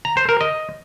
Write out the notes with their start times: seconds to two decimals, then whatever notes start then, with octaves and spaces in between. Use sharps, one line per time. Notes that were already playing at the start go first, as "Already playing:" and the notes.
0.05 A#5
0.17 C5
0.29 A#4
0.41 D#5